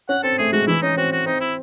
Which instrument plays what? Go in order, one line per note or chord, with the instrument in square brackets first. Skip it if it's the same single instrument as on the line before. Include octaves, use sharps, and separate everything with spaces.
[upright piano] C#4 [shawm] F#5
[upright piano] C4 [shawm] A4
[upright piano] A3 [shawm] G#4
[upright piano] G#3 [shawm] F#4
[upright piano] E3 [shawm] E4
[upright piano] C#4 [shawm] D#4
[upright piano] C4 [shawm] F#4
[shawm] F#4
[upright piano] C4 [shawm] D#4
[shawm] E4